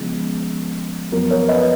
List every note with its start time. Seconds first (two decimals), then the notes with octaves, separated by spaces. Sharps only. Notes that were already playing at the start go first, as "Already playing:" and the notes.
Already playing: C#3 F3 G#3 B3
1.12 F#2 F3 B3 A#4
1.30 A#4 C#5
1.48 B4 D#5